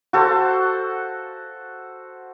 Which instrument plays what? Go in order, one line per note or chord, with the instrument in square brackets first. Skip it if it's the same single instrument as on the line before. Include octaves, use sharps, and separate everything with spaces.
[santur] F#4 A4 C5